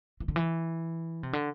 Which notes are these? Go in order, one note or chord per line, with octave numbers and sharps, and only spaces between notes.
E3
D3
E3
C3
D3